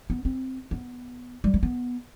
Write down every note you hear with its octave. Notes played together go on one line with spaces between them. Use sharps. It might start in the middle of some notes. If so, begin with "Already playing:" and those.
B3
C4
B3
G3
A3
B3